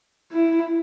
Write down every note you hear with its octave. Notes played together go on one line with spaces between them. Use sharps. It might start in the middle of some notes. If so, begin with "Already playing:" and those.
E4